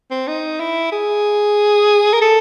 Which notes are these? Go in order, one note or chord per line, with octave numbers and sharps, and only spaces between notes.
C4
D#4
E4
G#4
A#4
A4